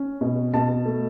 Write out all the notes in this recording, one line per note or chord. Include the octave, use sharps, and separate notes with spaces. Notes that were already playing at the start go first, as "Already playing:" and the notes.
Already playing: C#4
B2
B2 A5
A3